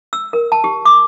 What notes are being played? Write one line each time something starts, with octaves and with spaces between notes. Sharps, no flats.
E6
A#4
A5
G4
D6